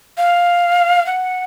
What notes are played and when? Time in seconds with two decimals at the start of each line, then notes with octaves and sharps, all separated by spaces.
0.18 F5
1.06 F#5